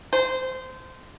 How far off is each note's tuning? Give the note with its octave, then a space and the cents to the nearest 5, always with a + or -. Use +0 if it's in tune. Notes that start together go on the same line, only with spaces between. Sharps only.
C5 -20